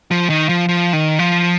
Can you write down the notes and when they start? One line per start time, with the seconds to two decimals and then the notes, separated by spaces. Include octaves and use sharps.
0.11 F3
0.30 D#3
0.49 F3
0.69 F3
0.93 D#3
1.19 F3